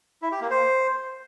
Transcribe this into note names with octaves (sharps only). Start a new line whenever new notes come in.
E4
G4
A#3
C5